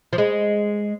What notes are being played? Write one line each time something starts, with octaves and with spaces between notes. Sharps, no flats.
F3
G#3